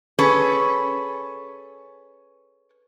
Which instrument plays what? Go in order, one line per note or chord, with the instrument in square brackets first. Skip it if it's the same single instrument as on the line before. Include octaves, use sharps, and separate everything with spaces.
[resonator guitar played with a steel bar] C#4 G#4 A4 B4